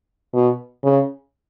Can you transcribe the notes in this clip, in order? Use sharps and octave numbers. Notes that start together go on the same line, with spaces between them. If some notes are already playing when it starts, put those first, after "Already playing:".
B2
C#3